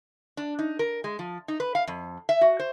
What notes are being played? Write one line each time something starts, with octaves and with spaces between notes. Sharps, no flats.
D4
D#4
A#4
G#3
F3
D#4
B4
F5
F2
E5
F#4
C5